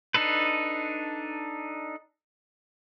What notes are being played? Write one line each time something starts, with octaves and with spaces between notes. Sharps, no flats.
D4 D#4 A4 B4